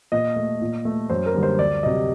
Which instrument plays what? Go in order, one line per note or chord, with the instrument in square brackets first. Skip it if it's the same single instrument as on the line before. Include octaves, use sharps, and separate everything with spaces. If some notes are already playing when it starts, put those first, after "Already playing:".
[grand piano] A#2 D#5
A3
A#2
A3
F#2 C5
A#4
D3 G3 A#3
C5
D2 D5
C3 F#3 D#5